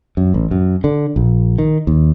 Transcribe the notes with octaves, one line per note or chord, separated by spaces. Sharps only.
F#2
A1
F#2
D3
A#1
D#3
D#2